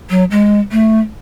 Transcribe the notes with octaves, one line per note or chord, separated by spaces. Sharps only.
F#3
G#3
A3